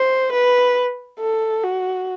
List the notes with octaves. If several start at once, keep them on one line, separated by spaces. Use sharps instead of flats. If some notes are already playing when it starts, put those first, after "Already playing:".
Already playing: C5
B4
A4
F#4